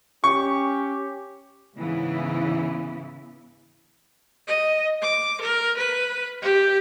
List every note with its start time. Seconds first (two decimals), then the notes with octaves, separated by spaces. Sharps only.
0.24 C#4 G4 C#6
1.76 G#2 C#3 E3 B3 E4
4.47 D#5
5.02 D6
5.41 A#4
5.77 B4
6.42 G4